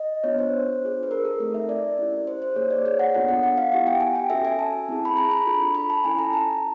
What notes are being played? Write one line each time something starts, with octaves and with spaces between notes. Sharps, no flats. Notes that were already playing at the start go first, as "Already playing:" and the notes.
Already playing: D#5
B3 D4 F4 C#5
C5
D4 F4 G#4
B4
A#4
A4
A3 C4 D#4 A#4
E5
D5
C#4 E4 G4
C5
C5
A#3 D#4 G#4 C#5
D5
C#5
F#5
B3 D4 F4 A4 F#5
F#5
F#5
F5
B3 E4 G4 F#5
G5
G#5
G5
C#4 F#4 A4 E5
G#5
A5
C4 E4 G#4
B5
A#5
B5
D4 F4 A4
B5
A5
C#4 E4 A4 G#5
A#5
A5